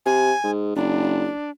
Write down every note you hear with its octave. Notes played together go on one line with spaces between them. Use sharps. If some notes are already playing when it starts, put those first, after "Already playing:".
C3 G#5
G#2
F#1 D4